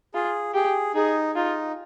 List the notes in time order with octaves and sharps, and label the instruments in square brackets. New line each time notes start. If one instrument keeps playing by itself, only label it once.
[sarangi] F4 [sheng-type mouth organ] G#4
[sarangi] G4 [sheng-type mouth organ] G#4
[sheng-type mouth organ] D#4 [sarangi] G#4
[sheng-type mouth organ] D#4 [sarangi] F4